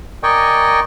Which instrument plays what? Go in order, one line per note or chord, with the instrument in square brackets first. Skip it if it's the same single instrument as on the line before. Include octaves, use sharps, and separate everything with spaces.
[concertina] A#4 D5 D#5 G5 G#5 C#6